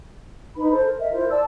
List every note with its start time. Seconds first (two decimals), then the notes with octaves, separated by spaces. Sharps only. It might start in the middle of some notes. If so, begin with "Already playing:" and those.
0.55 D#4 B4 B5
0.71 A4 C5
0.84 A#4
0.98 A#4 D#5 E5
1.11 E4 F4 A#4 C5
1.30 D5 A5 E6